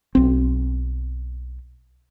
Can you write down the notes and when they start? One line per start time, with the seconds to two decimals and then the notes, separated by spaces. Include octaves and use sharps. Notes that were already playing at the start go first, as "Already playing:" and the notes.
0.15 B1 C4